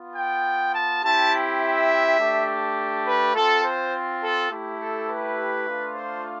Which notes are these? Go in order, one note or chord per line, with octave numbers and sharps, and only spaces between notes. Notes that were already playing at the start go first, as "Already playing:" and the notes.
Already playing: B3 F4
G5
A5
C4 E4 G4 A5
E5
A3 D4 G4
B4
C4 F4 A4
C5
A4
A3 E4 G4
A4
B4
A3 D4 F4
C5